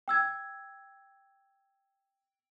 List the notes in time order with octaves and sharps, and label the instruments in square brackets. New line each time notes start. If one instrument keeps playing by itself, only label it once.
[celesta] G5 E6 G#6